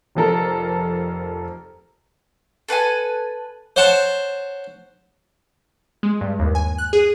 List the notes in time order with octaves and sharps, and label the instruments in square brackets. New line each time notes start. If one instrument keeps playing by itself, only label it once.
[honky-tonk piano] F1 F2 A4 A#4
[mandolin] A4 B4 F5 G#5
[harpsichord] C5 C#5 F#5 A5
[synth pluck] G#3
G2
D#2
G#5
F#6
G#4